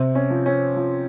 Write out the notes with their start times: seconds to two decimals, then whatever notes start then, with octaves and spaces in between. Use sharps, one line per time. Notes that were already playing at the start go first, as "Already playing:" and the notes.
Already playing: C3 C4
0.15 C#4
0.30 F3
0.46 C#4
0.76 F3